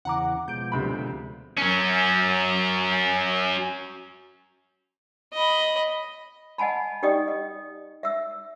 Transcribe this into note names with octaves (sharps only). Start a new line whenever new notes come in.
E2 C#3 F#5 A#5 D6
B2 F3 G#3 G6 D7
D2 C3 B5
F#3 C#4
D#5 B5
D#5 F#5 G#5 A5 B5
D#4 G4 D5 D#5 G5 D#6
D#5
E5 E6